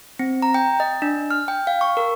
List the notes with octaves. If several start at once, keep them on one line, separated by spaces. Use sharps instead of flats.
C4
A#5
G5
D#5
D4
F6
G5
F5
C#6
A#4